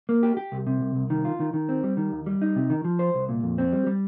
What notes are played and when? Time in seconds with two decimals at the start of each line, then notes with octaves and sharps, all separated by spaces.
0.09 A#3
0.23 G4
0.37 G4
0.52 C2
0.67 C3
0.81 C2
0.95 C2
1.10 D#3
1.25 F4
1.40 D#3
1.54 D#3
1.69 C4
1.84 G3
1.97 D#3
2.12 D#2
2.26 G3
2.42 D#4
2.56 C3
2.70 D#3
2.85 F3
2.99 C5
3.15 C2
3.29 A#2
3.43 F2
3.58 C4
3.73 G3
3.87 G3